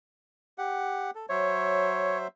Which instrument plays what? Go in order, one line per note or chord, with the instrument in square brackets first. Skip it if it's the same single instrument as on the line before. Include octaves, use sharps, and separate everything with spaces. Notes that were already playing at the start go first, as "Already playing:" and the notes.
[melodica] G4 F#5
A4
[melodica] F#3 C5 E5 [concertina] C#5